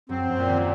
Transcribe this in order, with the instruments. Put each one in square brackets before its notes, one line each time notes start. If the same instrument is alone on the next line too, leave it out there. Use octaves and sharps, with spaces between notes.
[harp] F#2 F#3 [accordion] C4
[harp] F#2 F#3
[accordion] A#2
[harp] D#2 D#3